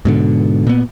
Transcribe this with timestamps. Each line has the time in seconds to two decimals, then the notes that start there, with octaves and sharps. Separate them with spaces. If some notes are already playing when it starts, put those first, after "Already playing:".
0.05 G#2 B2 D3
0.67 A#2 B3